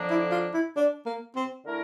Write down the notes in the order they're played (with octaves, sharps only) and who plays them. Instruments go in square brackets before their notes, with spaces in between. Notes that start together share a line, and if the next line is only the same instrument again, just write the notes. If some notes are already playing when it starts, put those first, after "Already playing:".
Already playing: [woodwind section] F2 D3 F3 A#3 D4
[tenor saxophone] E4
F4
E4
D4
A#3
C4
[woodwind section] D3 A3 E4 A#4